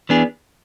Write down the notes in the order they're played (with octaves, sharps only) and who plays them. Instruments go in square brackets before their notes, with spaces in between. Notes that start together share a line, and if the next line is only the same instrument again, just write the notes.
[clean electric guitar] E3 B3 D4 G#4